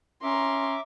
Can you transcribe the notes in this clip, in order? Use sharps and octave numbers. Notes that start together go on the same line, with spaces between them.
C#4 E5 A#5 C6 D6